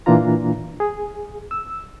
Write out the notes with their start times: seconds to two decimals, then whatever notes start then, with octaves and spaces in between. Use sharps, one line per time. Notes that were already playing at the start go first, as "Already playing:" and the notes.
0.06 A#2 E3 A#3 D4 F4 A#5
0.80 G#4
1.51 E6